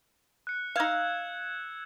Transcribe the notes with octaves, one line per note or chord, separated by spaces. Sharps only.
F#6 C#7
D#4 F5 E6 G#6 E7